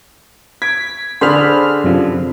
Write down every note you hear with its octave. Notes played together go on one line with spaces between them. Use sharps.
G#6 B6 D7
D3 D4 G#4 C5 B5 F6
F#2 C3 F3